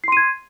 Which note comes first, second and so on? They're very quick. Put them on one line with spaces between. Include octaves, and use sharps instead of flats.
C7 C6 D#7 G#6